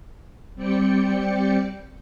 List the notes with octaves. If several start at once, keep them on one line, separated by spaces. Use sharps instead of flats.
G3 C4 D5 G5 C#7